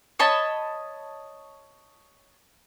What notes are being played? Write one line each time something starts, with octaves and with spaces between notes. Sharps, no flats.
C#5 D#5 A5 B5